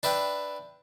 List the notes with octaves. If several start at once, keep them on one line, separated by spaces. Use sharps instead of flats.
D4 B4 E5 G5